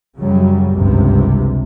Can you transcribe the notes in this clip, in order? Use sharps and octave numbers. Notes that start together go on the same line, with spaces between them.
F#2 C#3 F#3 G3
G#1 C#2 G2 C3